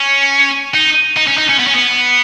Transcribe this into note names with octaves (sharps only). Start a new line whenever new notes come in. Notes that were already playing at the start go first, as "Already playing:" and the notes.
Already playing: C#4
D#4
D#4
C#4
D#4
C#4
B3
C#4
B3